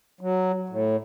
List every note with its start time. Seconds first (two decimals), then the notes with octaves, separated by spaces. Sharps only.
0.21 F#3
0.69 A2